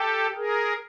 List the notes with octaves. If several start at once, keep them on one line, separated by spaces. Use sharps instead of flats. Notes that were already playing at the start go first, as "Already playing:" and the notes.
Already playing: G4 A4
G#4 A#4